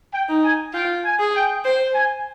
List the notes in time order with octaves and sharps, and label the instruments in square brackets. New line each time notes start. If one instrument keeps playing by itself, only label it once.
[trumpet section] G5
[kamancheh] D#4
[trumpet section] G#5
[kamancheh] F4 [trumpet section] G5
[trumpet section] G#5
[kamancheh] G#4
[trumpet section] G5
[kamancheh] C5 [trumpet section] G5
[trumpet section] G#5